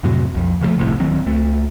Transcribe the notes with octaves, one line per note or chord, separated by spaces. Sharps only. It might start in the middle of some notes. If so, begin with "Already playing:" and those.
F2 A2 C3 F#3
B1 F2
C#3 F3 F#3 A3
G1 C2 A2 C3
D1 D#3 F#3 C4
C#2 A3